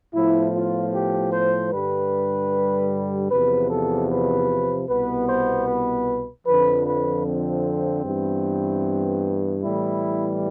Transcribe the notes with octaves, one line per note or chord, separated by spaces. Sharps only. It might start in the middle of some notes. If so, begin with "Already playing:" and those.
A2 F3 B3 E4
F4
G4
C5
G2 D3 G3 B4
E2 C3 F3 B4
A4
B4
C2 B2 B3 B4
C5
B4
F2 D3 F3 B4
B4
C4
G2 E3 B3
A2 E3 G3 B3 E4